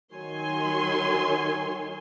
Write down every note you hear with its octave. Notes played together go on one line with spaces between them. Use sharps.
D#3 F#3 C#5 G#5 C6